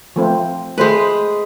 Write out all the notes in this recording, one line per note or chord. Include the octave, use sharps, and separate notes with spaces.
F3 A3 C4
G#3 A3 B4 C5